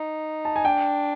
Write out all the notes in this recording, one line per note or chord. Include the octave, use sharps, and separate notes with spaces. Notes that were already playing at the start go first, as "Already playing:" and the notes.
Already playing: D#4
A5
G#5
D4 G5